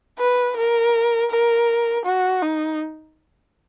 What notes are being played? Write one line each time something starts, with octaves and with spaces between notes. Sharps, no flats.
B4
A#4
A#4
F#4
D#4